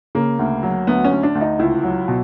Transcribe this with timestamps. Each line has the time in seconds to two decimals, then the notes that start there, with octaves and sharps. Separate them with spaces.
0.15 C#3 A#3
0.39 D2
0.63 F#3
0.87 D2 B3
1.05 C#4
1.11 D2
1.23 D4
1.35 D2
1.41 D#4
1.59 C#2 E4
1.83 F#3
2.08 B2